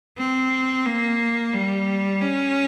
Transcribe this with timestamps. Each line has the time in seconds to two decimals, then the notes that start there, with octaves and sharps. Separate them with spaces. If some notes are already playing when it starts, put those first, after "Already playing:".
0.18 C4
0.86 A#3
1.54 G3
2.21 C#4